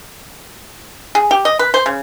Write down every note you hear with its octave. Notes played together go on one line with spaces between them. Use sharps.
G#4
G4
D#5
B4
C5
C#3